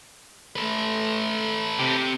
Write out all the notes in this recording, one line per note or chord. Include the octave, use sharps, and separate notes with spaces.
A3 A4 B4
C3 G4